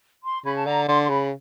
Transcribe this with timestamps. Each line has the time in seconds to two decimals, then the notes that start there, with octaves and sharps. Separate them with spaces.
0.24 C6
0.45 C#3 B5
0.56 A5
0.66 D3 A#5
0.87 D3 C6
1.03 C6
1.09 C#3 B5